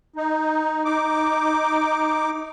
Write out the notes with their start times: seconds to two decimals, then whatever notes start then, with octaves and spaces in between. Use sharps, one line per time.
0.16 D#4
0.85 D#4 D6